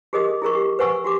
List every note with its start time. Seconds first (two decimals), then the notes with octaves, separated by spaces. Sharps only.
0.13 G4 G#4 A#4 D#5 D#6
0.29 G#4
0.42 E4 G#4 A#4 C#6
0.55 G4
0.79 B4 C5 F#5 G#5 C#6 E6
1.05 F#4 G4 D6